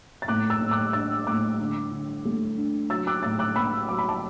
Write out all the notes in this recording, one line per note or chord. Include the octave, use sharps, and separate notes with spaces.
A6
A2 D6 F#6
E6 A6
A2
D6 F#6
D4 E6 A6
A2 D6 F#6
D3
D3
A3
D4
F#3 E6 A6
D6 F#6
A2 E6 A6
D6 F#6
B3 B5 E6
F#3 D6
B5
A5 D6